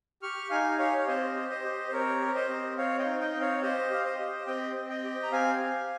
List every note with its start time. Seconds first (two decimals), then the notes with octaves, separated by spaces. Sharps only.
0.22 G4 C#6 F6
0.50 D#4 F5 G#5
0.79 G4 C#5 F5
0.98 C#5
1.07 C4 C5 D#5
1.36 G4
1.50 C5 D#5
1.64 G4
1.88 C5
1.93 C4 A#4 C#5
2.21 G4
2.35 C5 D#5
2.49 C4
2.77 C4 C#5 F5
2.99 D#5 G5
3.05 D#4
3.20 D#5 G5
3.34 C4
3.41 C#5 F5
3.62 G4 C5 D#5
3.90 G4 F5
4.05 C5 D#5
4.19 G4
4.47 C4 D#5 G5
4.76 C4
4.89 D#5 G5
5.04 G4
5.23 A#5
5.32 C4 F5 G#5
5.60 G4